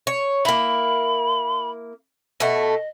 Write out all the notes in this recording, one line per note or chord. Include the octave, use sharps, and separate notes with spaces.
C#5
A#3 E4 B5
B2 A3 D#5